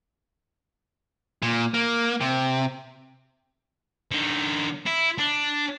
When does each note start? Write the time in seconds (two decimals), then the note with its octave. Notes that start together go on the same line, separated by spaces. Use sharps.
1.42 A#2
1.74 A#3
2.21 C3
4.11 D3 D#4
4.86 E4
5.18 D4